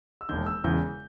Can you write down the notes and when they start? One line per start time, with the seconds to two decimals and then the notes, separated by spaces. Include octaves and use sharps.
0.21 E6
0.29 E1 D#2 D#3 G6
0.46 E6
0.64 E1 E2 C#3 E3 G6